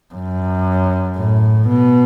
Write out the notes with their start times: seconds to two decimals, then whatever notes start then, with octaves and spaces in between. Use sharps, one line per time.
0.14 F#2
1.17 A2
1.68 B2